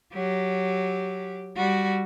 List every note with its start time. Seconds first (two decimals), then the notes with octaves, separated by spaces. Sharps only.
0.13 F#3 G4
1.57 G3 F#4